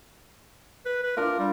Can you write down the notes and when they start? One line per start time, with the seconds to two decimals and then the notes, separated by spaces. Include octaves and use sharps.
0.85 B4
1.03 B4
1.17 D4 F4 A#4
1.39 G3